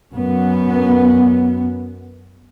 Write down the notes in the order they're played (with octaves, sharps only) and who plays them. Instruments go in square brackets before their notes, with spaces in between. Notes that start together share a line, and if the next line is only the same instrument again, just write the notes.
[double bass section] F#2 B3